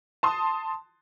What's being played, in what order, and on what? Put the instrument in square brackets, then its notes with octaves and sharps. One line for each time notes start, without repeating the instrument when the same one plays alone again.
[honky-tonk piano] A5 C6 D#6